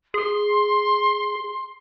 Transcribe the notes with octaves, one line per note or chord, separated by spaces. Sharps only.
G#4 C6